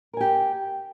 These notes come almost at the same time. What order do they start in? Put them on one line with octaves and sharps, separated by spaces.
A#4 G#5 G4